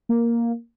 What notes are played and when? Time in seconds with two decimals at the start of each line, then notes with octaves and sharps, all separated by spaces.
0.09 A#3